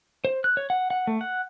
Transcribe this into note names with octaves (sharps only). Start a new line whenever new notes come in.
C5
F#6
C#5
F#5
F#5
A3
F#5